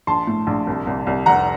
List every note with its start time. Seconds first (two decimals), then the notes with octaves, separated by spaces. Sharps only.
0.07 A#1 A5 C6
0.27 A2
0.47 A#1
0.67 C2
0.87 C2
1.07 C2
1.26 F1 F#5 A#5